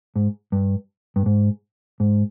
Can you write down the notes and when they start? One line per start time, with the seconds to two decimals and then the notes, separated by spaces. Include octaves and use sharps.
0.16 G#2
0.52 G2
1.16 G2
1.26 G#2
2.00 G#2